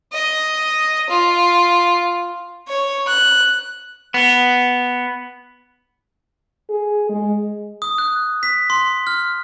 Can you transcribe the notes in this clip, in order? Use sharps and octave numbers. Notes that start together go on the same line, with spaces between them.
D#5
F4
C#5
F#6
B3
G#4
G#3
D#6
F#6
B6
C6
F6